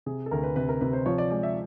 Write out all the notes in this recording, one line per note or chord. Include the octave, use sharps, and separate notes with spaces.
C3 G#4
A4
D2 A#4
B4
C3 B4
A#4
C3 B4
C5
F3 C#5
D5
G#3 D5
E5